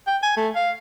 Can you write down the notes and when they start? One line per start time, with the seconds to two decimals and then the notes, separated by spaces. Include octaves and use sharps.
0.07 G5
0.23 G#5
0.37 A3
0.55 F5